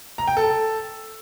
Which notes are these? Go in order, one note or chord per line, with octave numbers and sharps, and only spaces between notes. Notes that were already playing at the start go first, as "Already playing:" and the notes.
A#5
G5
A4